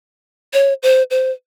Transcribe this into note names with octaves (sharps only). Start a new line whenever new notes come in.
C#5
C5
C5